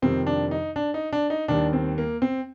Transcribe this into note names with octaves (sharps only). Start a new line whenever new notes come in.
F2 C3 D#3 G3 C4
D4
D#4
D4
D#4
D4
D#4
D#2 D#3 G3 D4
C4
A#3
C4